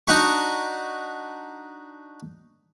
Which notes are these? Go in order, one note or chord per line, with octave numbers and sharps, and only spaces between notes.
D4 D#4 F#4 B5 C#6